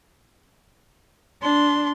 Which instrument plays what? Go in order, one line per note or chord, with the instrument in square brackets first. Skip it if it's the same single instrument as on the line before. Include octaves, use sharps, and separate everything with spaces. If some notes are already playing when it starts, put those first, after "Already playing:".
[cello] D4 [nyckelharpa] C6